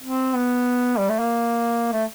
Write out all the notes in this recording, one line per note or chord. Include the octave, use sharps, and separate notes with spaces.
C4
B3
G3
A3
A#3
A3